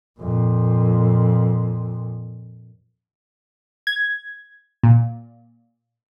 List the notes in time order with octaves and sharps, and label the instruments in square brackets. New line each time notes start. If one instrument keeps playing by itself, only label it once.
[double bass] F2 A#2
[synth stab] G#6
A#2